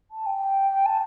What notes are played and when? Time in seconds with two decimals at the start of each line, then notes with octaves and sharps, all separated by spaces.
0.11 A5
0.26 G5
0.85 A5